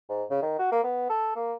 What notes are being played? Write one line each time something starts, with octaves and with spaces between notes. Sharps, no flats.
G#2
C#3
D#3
F#4
A#3
B3
A4
A#3